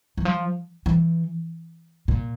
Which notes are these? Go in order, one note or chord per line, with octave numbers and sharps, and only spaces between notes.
E3
F3
E3
A#2